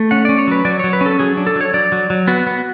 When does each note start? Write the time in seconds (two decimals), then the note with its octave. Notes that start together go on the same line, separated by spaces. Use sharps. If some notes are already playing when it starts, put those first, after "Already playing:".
Already playing: A3
0.11 C#4 F#5
0.25 C#4 D5
0.38 C#5
0.48 F#3 B4
0.65 F#3 D5
0.79 F#3 C#5
0.93 B4
1.01 C#4
1.06 A4
1.19 F#3 G#4
1.37 D4
1.47 A4
1.56 F#3 C#5
1.74 F#3 D5
1.92 F#3
2.10 F#3
2.28 B3 F#4
2.47 B3